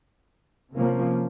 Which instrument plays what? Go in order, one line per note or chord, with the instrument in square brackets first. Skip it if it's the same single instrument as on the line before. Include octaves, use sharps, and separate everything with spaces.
[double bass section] C3 F3 A#3 C#4